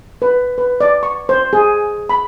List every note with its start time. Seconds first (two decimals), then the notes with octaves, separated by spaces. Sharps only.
0.22 B4
0.58 B4
0.81 D5
1.03 C#6
1.29 C5
1.53 G#4
2.10 B5